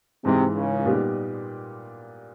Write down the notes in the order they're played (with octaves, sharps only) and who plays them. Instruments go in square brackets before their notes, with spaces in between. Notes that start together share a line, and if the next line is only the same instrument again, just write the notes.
[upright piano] G#2 E3 G#3 [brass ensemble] C3
[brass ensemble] C#2 C#3
[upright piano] A#2 G3 B3 D#4 G4